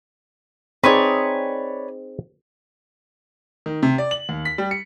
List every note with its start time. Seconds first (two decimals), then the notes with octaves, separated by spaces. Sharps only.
0.84 C4 D#4 G#4 B4 C#5 D5
3.66 D#3
3.83 C3
3.98 D5
4.11 F#7
4.29 D#2
4.45 B6
4.58 G3
4.71 C#7